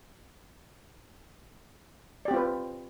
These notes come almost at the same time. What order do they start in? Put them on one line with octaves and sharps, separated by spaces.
D5 G4 C4 F4 B4